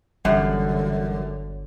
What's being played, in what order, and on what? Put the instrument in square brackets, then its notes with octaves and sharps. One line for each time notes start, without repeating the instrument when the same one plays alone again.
[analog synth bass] G1 [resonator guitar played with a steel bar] F#2 [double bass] D3 [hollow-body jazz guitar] E3 G3 F#5